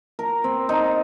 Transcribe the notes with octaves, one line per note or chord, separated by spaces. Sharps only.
A#4
C4
D#4